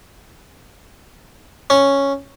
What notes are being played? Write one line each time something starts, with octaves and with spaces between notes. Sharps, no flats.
C#4